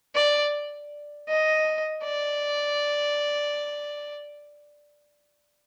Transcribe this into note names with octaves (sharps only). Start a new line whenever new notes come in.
D5
D#5
D5